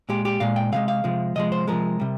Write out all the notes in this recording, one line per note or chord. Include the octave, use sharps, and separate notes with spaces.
A#2 G#3 G4
G4
A#2 G#3 F5
G5
C3 F3 G#3 F5
F5
C3 F3 G#3
C3 F3 G#3 D#5
C5
C3 F3 G#3 A#4
C3 G3